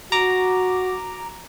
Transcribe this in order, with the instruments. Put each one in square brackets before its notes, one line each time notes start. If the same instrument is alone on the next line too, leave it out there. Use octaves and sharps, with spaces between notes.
[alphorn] F#4 [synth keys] A#5 D6